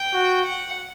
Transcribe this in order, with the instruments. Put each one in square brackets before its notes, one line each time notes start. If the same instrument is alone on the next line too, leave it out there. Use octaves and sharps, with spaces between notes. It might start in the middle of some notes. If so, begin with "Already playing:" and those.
Already playing: [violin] G5
[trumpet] F#4
[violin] F#5